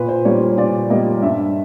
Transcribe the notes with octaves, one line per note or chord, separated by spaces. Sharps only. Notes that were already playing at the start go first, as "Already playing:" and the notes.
Already playing: A#2 B4
C5
G3 A#3 C#5
A#2 D5
G3 A#3 D#5
G2 E5